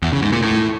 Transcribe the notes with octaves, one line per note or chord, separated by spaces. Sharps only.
E2
C#3
G#2
A#2
A2